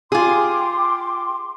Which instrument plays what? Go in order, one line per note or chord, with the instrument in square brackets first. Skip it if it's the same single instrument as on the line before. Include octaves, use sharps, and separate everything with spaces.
[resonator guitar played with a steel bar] F4 G#4 [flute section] G5 C6 D6